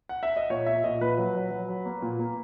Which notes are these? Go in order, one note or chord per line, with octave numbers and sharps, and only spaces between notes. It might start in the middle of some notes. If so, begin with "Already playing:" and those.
F#5
E5
D#5
A#2 C#5
A#2 E5
A#2 D#5
A#2 B4
F#3
F#3
F#3
F#3
A#3
A#2
A#3